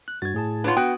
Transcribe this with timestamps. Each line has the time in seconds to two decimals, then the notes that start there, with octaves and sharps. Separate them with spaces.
0.08 F#6
0.22 G2 F#4 G#6 A6
0.34 A2 G#4 A5
0.64 D4 F4 B4 C#5 F#5
0.77 B3 F#4 G5 D#6 F#6